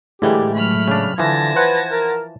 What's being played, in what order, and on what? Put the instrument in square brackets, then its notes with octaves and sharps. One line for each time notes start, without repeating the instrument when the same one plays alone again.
[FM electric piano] A2 G#3 [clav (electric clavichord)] D3 E3 G3 [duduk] G4
[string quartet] F#3 B5 F6 [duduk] A3
[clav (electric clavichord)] C#3 D4
[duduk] D3 [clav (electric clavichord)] E3 F3 [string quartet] A5 G#6 A#6
[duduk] B4 [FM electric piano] C5 F#5
[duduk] A#4